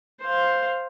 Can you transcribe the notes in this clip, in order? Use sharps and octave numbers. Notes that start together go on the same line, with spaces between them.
C5 F5